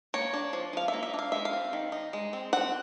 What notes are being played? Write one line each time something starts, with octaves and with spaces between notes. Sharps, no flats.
A#3 C#5
D4
F3
F3 F5
E5
A#3
E5
D4
F5
G#3 E5
F5
C4
D#3
D#4
G#3
C4
C4 F#5